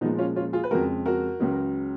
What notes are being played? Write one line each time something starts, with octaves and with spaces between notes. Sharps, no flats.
A#2 F3 G#3 B3 D#4
C#4 F4
C#4 F4
F4 G#4
B4
F2 C#3 G#3 F#4 A#4
F#4 A#4
C#2 C#3 F#3